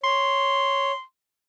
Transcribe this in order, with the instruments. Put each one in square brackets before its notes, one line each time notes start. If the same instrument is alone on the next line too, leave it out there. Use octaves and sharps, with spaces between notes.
[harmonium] C#5 [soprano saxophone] C6